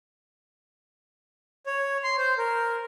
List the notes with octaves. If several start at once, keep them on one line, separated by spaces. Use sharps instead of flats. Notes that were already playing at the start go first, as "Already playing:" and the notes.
C#5
C6
C5
A#4